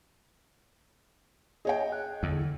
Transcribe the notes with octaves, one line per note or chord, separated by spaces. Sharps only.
G#4 C#5 D#5 G5
F#6
E2 D3